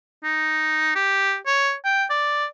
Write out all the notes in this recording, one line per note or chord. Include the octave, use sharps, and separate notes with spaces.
D#4
G4
C#5
G5
D5